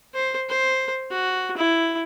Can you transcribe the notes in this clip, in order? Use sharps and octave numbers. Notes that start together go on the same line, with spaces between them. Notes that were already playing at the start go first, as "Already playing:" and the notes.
C5
C5
F#4
E4